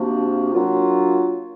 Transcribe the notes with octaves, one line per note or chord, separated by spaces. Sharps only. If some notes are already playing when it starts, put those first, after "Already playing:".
Already playing: C3 F3 A#3 D4 F#4
F#3 A#3 D4 F4